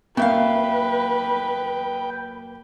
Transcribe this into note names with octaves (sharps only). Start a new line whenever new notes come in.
F#2 A#3 B4 E5 F5 G5